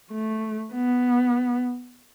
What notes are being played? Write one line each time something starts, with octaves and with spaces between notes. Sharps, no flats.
A3
B3